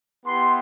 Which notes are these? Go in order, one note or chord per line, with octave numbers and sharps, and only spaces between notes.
B3 E4 G4 C6